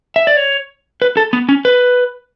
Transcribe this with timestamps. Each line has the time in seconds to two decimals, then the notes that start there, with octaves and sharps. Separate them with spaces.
0.16 E5
0.27 D5
0.37 C#5
1.02 B4
1.17 A4
1.33 B3
1.49 C#4
1.65 B4